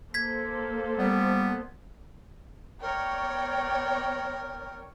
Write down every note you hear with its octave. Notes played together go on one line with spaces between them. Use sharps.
A#3 A4 C5 G#6 B6
G3 B3
B3 A#4 C#5 D5 G5